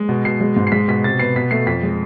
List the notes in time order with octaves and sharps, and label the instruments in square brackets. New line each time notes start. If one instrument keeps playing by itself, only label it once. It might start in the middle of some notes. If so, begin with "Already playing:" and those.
Already playing: [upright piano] G#3
B2
B2 C7
G#3
G#2
C7
G#3 B6
B2 B6
C3 A6
B3 C7
B2 B6
A3 C7
F2 B6
G#3